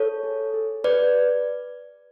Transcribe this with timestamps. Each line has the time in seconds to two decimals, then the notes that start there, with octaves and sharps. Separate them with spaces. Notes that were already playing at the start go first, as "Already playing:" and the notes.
Already playing: A4 C#5
0.23 G#4
0.54 G#4
0.84 G#4 B4 D5